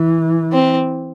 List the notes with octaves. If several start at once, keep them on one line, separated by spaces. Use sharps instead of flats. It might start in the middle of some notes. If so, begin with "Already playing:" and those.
Already playing: E3
C4